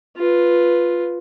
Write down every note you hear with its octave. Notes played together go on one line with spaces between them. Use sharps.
F4 B4